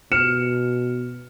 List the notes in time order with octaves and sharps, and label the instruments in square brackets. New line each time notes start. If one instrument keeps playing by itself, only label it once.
[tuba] B2 [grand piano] F6 C#7 E7